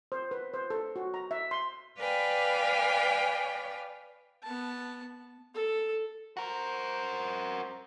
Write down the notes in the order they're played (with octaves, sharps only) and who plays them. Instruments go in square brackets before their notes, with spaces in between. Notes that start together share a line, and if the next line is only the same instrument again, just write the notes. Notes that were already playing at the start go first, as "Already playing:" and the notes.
[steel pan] C5
B4
C5
A4
F#4
A#5
E5
C6
[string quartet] B4 D5 F5 G5 G#5
[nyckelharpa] B3 A5
A4
[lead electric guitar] F#4 A#4 [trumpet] C5